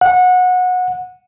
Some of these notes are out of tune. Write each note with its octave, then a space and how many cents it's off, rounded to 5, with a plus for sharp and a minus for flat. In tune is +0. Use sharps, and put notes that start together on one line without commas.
F#5 -20